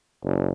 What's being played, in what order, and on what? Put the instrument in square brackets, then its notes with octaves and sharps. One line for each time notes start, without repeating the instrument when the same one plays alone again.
[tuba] F#1